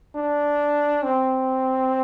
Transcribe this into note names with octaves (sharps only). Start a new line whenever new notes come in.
D4
C4